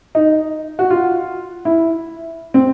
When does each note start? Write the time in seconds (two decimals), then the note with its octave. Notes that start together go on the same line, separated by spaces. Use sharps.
0.15 D#4
0.79 F#4
0.90 F4
1.65 E4
2.54 C4